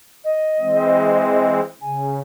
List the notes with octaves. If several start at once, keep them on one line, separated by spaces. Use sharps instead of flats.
D#5
E3 G#3 C4
C#3 G#5